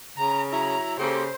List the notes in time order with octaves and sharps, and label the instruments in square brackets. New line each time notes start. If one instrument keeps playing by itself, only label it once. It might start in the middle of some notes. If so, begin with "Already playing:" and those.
[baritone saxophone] C#3 [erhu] A#5
[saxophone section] F#3 E4 [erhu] A#5
[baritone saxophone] C#3 [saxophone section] A#3 G4 A4 [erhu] C5